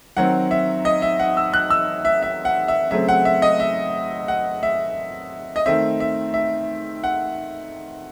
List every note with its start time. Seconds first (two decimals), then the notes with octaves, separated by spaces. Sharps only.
0.17 D#3 F#3 C4 F#5
0.51 E5
0.85 D#5
1.02 E5
1.19 F#5
1.37 E6
1.54 F#6
1.70 E6
2.05 E5
2.23 E5
2.45 F#5
2.68 E5
2.91 C#3 F#3 A3 C4 E5
3.08 F#5
3.25 E5
3.42 D#5
3.60 E5
4.28 F#5
4.63 E5
5.56 D#5
5.66 D#3 A3 C4 E5
6.00 E5
6.34 E5
7.04 F#5